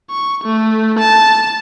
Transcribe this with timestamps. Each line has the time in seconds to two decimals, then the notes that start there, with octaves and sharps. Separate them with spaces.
0.10 C#6
0.44 A3
0.99 A5